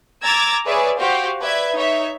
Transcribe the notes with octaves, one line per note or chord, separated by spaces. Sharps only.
A#5 D6 E6 G#6 A6
G#4 B4 C#5 D5 E5
F#4 G4 C5 F5
B4 D5 E5 G#6
D#4 C#5 E5